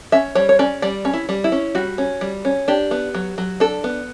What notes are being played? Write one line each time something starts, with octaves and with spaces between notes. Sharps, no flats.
C#4 E5
G3 C#5
C#5
C#4 D5
G3 D5
C#4
E4
G3
E4
C#4
G3 F#4
C#4
G3
C#4
D4 G4
B3
F#3
F#3
D4 A4
B3